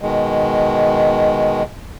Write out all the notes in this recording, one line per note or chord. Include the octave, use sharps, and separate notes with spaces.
B2 D#3 G#3